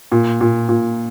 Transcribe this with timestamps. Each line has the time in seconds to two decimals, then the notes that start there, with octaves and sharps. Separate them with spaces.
0.12 A#2
0.41 A#2
0.69 A#2